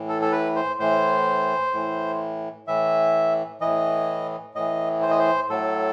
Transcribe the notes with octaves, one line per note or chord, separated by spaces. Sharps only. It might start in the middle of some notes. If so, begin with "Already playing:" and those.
Already playing: A2 E3
A4
A4
B4
C5
A2 E3 C5
A2 E3
A2 E3 E5
A2 E3 D#5
A2 E3 D#5
C5
D#5
C5
A2 F#3 A4